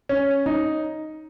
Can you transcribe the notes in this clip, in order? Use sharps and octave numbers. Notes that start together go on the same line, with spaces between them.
C#4
D#4